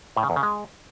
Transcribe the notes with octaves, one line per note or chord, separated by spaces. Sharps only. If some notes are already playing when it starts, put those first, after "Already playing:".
A2
C#3
E2
C#3
G#3